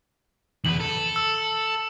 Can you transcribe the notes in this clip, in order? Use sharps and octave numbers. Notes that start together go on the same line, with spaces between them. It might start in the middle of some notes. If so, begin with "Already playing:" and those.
E2 B4 F#7
A4
E6